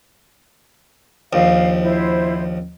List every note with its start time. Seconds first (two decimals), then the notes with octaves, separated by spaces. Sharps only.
1.33 A#1 D#2 F5
1.82 E4 C5